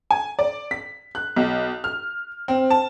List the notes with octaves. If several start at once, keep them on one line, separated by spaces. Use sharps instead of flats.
G#5
D5
B6
F#6
B1
F6
C4
A5